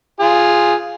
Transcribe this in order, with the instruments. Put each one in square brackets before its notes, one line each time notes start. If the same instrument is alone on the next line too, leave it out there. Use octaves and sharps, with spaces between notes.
[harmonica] F4 G#4